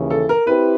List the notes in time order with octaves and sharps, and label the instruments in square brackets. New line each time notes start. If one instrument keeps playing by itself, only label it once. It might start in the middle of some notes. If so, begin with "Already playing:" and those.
Already playing: [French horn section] D#2 C#3 E3
[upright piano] A4
A#4
[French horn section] C4 E4 G4 [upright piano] B4